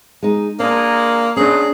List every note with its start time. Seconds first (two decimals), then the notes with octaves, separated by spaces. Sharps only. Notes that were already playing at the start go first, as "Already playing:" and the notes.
0.23 G#3 D#4
0.60 G#3 A#3 D4 G#4 A#4
1.36 F#2 D#3 F#3 C#4 D4 G#4